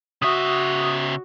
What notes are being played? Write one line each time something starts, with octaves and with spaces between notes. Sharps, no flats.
C#3 F#4 E5 D#6